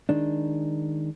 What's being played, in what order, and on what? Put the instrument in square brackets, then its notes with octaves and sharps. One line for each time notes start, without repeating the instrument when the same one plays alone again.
[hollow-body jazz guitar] D#3 G#3 D4